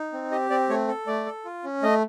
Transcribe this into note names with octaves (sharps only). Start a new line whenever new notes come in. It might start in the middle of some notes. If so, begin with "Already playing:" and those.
Already playing: D#4
C4
G4 D#5
C4 D5
A3 C#5
A4
A3 D5
A4
F4
C#4
A3 D#5